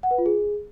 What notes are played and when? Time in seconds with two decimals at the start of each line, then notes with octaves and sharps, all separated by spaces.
0.03 F#5
0.11 B4
0.18 F4
0.26 G#4